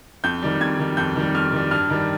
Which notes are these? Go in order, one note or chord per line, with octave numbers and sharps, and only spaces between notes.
F2 G6
D#3 G3
F2 G#6
D#3 G3
F2 G6
D#3 G3
F2 F6
D#3 G3
G2 F6
D#3 G3